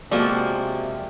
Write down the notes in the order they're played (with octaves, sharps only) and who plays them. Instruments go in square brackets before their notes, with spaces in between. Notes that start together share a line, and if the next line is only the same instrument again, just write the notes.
[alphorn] C3 [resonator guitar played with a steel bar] F3 A#3 [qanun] G#3 F#4 A4 [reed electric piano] D5